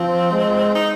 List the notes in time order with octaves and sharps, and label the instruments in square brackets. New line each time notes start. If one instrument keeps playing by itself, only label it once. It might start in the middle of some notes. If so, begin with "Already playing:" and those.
Already playing: [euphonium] F3 [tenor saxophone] C4
[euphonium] G#3
[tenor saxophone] D#4